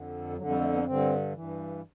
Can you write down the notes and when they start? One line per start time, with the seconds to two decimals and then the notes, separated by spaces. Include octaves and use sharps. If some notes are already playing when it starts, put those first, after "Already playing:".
Already playing: F2 D3
0.37 F2 D3 F#3
0.49 G3
0.61 A3
0.74 B3
0.85 G2 D3 C4
1.33 G2 E3